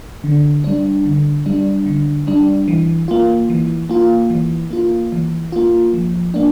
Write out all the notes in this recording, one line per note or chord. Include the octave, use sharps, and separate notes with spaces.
D3
G3 D4
D3
G3 D4
D3
G3 D4
E3
A#3 F4
E3
A#3 F4
E3
A#3 F4
E3
A#3 F4
F3
A#3 D4